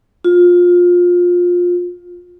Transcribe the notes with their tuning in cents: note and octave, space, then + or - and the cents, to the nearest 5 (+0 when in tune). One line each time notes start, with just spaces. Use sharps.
F4 +20